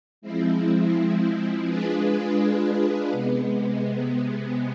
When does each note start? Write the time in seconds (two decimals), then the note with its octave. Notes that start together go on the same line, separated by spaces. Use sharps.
0.22 F3 G#3 C4 E4
1.66 G#3 D4 F4 G#4 B4
3.09 C3 G#3 B3